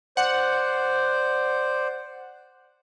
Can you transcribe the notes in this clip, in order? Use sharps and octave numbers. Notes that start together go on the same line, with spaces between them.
C5 D5 F#5